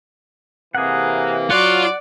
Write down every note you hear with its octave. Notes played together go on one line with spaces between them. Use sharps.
C3 E3 A#3 G#4 F#5
F#3 F4 F#4 D5 F#5